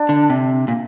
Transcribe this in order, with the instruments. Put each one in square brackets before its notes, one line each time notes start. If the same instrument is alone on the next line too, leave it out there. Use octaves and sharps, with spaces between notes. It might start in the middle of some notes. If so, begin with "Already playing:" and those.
Already playing: [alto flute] D4
[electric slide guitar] D3
C3
A#2